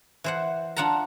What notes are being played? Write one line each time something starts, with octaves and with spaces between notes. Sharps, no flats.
E3 C5 F#5
D4 F4 F#5 A5 A#5